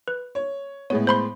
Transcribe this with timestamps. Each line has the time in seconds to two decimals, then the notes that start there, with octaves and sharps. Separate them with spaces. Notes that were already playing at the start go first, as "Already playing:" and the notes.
0.08 B4
0.35 C#5
0.90 A2 G#3 B3 C#5
1.07 C5 B5 C6